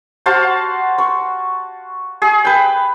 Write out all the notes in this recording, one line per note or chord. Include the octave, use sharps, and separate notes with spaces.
F#4 C5 F5 A5
C#6
G#4
B4 G5